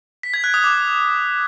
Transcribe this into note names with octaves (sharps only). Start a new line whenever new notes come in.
B6
G#6
F#6
D#6
D6